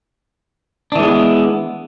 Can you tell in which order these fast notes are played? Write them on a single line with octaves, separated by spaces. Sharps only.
D4 E3 G#3 B3